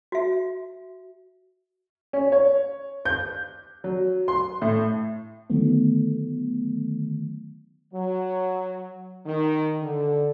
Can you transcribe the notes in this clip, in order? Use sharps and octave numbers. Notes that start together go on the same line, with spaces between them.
F#4 E5
C#4
C#5
G6
F#3
C6
A2
D3 D#3 F#3 A3 B3
F#3
D#3
D3